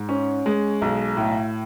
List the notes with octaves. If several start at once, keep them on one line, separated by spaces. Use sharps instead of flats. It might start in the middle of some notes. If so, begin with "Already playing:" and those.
Already playing: G#2
C#4
G#3
B1
A2